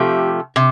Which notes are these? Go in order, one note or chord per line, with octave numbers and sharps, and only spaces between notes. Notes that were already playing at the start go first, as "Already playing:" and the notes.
Already playing: C3 F3 A3 G4
C3